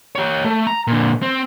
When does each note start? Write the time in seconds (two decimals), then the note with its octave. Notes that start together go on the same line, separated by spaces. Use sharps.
0.15 G4 C#5
0.45 A3
0.67 A#5
0.87 A#2 D3
1.22 C4